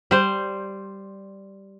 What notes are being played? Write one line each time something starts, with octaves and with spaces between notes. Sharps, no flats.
G3 C5